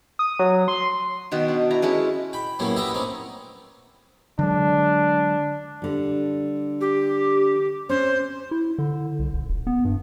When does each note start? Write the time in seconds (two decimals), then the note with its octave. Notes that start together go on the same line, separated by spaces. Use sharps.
0.19 D#6
0.39 F#3
0.68 C6
1.32 B2 D#3 F#4
1.48 D4
1.71 E4 A#5
1.82 G#3 C#4 E4 A4
2.33 G5 B5
2.59 F#2 A2 G3 A#3 B3 C#4
2.76 B3 D4 G4 D#5 E5
2.94 C4 C#4 D#4
4.39 D3 F#3 G#3 D4
5.82 D3 G3
6.81 G4
7.89 C4 C#4 C5
8.51 E4
8.78 D3
9.19 C2
9.33 D#1
9.50 D#1
9.67 B3
9.85 G2